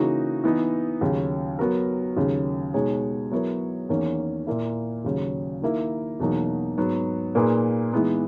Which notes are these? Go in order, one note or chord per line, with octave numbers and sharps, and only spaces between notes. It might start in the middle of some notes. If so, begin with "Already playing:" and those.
Already playing: C#3 E3 A#3 D#4 F#4
E3 B3 D#4
D#2 C#3 F#3
F#3 B3 F#4 A#4
D#2 C#3 F#3
B2 G#3 D#4 G#4 C#5
F#3 B3 E4 A#4 C#5
E2 D#3 A#3 C#4
A#2 A#3 E4
D#2 C#3 F#3
D#3 A#3 E4 A#4
E2 B2 F#3 A#3 D#4
G#2 F#3 B3
A#2 A#3 D#4 G#4 B4
E3 G#3 B3 D#4